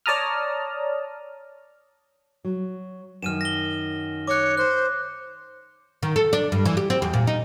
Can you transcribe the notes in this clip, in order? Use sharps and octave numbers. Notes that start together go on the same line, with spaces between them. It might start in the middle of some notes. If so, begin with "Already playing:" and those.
C#5 D5 A5 A#5 D#6 F6
F#3
F#2 D#3 F6 D#7 E7
A#6 G7
C#5 D6 F#6
C5 F#6
D#3
A4
D4
G2
E3
G4
C4
E2
A#2
D#4